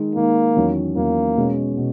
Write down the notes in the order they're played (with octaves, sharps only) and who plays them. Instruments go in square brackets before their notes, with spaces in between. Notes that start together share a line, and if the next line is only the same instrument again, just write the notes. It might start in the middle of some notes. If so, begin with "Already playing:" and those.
Already playing: [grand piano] D#3 G#3 D#4
[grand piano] D#3 G#3 D#4 [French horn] A#3
[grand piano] E2 D#3 F#3 C#4
[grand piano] E2 D#3 F#3 C#4 [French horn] A#3
[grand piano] B2 G#3 C#4
B2